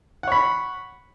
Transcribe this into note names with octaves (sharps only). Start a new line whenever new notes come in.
C#5 F#5 B5